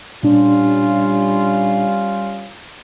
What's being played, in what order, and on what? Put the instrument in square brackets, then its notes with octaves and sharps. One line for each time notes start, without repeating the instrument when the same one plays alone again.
[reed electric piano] A#2 D4 [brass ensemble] G3 C#4 F4